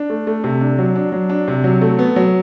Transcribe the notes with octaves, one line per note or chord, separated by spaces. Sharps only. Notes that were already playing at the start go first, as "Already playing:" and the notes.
Already playing: D4
A3
A3
C3
D4
F#3
D4
F#3
D4
C3
F#3
A3
B3
F#3